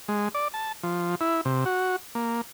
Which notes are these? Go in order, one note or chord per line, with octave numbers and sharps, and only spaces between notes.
G#3
D5
A5
F3
E4
C3
F#4
A#3